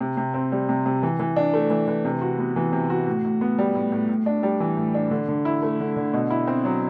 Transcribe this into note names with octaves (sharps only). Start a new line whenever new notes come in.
C3
C3
C4
G3
C3
C3
E3
E3
D4
A3
E3
E3
C3
F#4
B3
E3
C3
F#4
A2
A2
B3
G3
A2
A2
A2
D4
G3
E3
A2
D4
D3
D3
E4
A3
D3
D3
B2
E4
C4
F#3